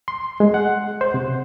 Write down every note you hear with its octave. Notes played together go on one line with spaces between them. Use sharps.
C6
G#3
F#5
C5
C3